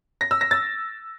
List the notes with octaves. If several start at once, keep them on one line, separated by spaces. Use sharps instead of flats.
A#6
E6
A#6
A6